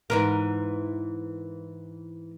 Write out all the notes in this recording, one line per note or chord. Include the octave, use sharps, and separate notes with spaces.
G#2 E3 A#4